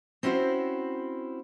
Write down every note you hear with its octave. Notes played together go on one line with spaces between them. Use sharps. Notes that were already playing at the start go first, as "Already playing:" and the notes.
C4 C#4 E4 F#4 C5